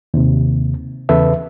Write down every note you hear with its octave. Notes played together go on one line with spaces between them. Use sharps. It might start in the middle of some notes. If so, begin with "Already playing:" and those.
D#2 C3
E2 C#3 A4 B4 E5